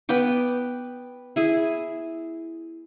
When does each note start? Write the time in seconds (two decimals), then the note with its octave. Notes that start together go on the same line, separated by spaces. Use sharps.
0.09 B3 B4 G5 D6
1.36 E4 G#4